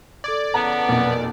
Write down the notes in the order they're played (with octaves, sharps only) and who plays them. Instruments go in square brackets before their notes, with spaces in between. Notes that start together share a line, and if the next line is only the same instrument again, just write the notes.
[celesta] A4 D6 G#6 [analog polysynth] D5
[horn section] C#3 E3 B3 [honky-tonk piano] A5 A#5
[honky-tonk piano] B1 F2 A#2